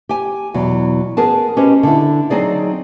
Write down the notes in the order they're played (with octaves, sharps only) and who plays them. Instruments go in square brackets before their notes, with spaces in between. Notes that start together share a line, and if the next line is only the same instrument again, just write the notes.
[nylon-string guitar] G4 G#5
E2 B2 F#3
B3 G#4 A#4 A5
C#4 G4 B4 C5 D#5
D3 E4
F#3 C4 D#4 G#4 D5